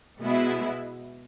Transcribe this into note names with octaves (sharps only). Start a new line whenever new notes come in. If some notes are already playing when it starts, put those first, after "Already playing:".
B2 G#3 B3 E4